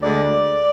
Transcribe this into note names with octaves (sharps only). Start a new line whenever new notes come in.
D2 D3 G#3 D5